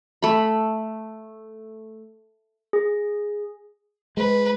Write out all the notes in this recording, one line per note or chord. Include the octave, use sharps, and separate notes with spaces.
A3 B5
G#4
G#3 B4